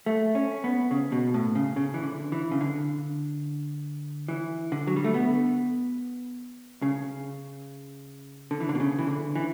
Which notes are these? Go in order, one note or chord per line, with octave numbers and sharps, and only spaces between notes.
A3
C#4
B3
C#3
B2
A2
C#3
C#3
E3
D3
E3
C#3
D3
E3
D3
F#3
G3
A3
B3
C#3
D3
E3
D3
B2
C#3
E3
D3
E3